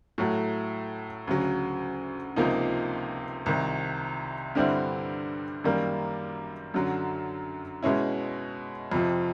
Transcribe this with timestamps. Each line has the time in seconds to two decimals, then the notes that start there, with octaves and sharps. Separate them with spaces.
0.18 A2 F#3 A3
1.27 D2 C#3 F#3
2.36 C#2 C3 F3 A#3 D#4
3.46 C2 C3 D#3
4.55 G2 D3 G3 C4 E4
5.64 F#2 D#3 G3 A#3
6.74 F#2 D3 F#3
7.83 B2 G#3 C#4 E4
8.92 F2 C3 F3